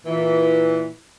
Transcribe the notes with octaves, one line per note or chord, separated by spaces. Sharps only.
A#2 E3